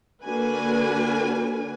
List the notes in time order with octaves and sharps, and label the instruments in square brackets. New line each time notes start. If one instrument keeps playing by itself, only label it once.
[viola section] D3 A#3 D4 F#4 B4 G#5